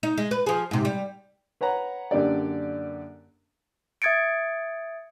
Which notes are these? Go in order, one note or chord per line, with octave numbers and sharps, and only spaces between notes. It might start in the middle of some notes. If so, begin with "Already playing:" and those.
D#4
G#3
B4
F3 G#4
G#2 C3
G3
B4 C#5 F#5 A#5
F#2 D3 A#3 D4 G4 D5
E5 D#6 G#6 A6 C#7 D7